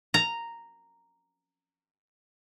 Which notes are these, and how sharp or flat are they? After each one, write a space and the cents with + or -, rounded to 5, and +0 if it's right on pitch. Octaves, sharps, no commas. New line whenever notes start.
A#5 -5